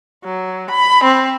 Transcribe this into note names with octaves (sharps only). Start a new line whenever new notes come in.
F#3
B5
C4